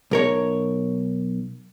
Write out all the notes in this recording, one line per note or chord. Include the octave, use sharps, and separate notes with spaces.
B1 A#4 C#5